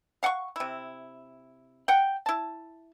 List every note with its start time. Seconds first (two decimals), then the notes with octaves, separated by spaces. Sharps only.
0.23 F5 F#5 G#5 C#6
0.56 C3 E4
1.88 F#5 G5
2.26 E4 A5